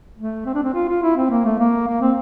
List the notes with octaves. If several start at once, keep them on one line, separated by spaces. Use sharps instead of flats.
A3
C4
D4
C4
F4
F4
E4
C4
A#3
A3
A#3
A#3
C4